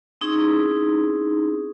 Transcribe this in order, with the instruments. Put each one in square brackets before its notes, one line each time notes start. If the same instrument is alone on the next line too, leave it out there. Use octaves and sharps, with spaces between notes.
[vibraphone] C4 C#4 D#4 E4 G#4